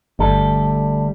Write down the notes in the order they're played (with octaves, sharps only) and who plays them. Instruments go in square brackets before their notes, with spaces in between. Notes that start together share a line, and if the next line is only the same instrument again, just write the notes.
[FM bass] G1 [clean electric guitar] D2 G3 A4